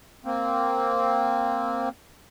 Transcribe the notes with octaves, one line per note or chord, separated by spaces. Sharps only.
A#3 C4